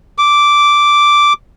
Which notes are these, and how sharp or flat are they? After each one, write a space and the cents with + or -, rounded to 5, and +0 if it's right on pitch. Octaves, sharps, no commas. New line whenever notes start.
D6 -5